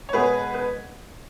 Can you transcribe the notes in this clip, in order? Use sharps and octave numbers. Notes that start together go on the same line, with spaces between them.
C#5
B2 G#3 B3 G#4 B4
B4